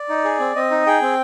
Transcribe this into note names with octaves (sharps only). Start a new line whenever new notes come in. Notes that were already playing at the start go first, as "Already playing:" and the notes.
Already playing: D5
D#4
G#4
C4
C4 D#5
D#4
G#4 G5
C4